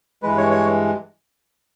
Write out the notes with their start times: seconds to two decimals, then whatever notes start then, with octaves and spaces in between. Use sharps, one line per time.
0.23 G2 E3 G#3 B4
0.37 C#5
0.51 C#5